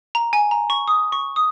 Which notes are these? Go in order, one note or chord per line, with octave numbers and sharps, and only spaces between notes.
A#5
G#5
A#5
C#6
D#6
C#6
D#6